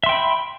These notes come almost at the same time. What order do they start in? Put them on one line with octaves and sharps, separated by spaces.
E5 C6 G5 B5